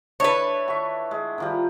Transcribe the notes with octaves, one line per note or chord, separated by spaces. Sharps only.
D4 E4 A4 B4 C#5
F#4 E5
G#3
D#3 F3 G3